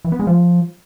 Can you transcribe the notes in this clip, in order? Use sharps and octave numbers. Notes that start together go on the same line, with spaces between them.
E3
B3
G#3
F3